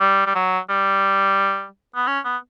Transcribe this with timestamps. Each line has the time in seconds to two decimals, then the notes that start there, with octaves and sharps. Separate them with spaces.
0.01 G3
0.27 G3
0.35 F#3
0.70 G3
1.95 B3
2.07 C#4
2.25 B3